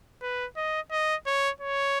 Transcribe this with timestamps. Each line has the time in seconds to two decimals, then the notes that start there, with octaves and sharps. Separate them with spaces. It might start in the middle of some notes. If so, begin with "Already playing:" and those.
0.22 B4
0.56 D#5
0.91 D#5
1.26 C#5
1.61 C#5